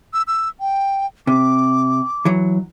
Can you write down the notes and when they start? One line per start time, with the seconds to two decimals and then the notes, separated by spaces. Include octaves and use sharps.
0.13 E6
0.27 E6
0.61 G5
1.27 C3 D6
2.25 E3 F#3